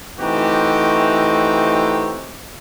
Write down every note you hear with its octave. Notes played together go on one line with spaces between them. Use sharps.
E3 A3 C4 D#4 F#4 G4